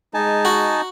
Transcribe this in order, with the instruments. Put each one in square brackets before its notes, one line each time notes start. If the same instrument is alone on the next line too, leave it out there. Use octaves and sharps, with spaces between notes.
[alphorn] G#3 [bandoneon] D#4 [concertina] G#5 A5
[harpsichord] F#4